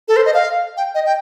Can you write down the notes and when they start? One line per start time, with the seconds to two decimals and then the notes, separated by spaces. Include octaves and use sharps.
0.08 A4
0.16 C5
0.26 D#5
0.34 F5
0.77 G5
0.95 D#5
1.06 G5